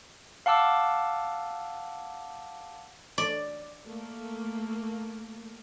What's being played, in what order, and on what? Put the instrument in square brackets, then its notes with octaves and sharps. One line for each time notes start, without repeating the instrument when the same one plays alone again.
[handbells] F5 F#5 A5 D6 E6
[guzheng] D5
[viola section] A3 A#3